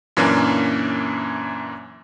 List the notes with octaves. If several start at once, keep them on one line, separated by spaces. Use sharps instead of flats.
F#2 A#2 E3 A#3 C#4 D4